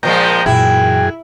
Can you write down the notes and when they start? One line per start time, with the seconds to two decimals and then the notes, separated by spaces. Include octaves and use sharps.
0.03 A#2 F3 G#3 G5 A#5
0.46 F#2 A#2 E3 E4 G#4 G5